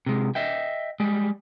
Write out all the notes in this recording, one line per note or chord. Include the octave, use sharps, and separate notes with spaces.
C3 G#3
D#5 E5 G5
G3 G#3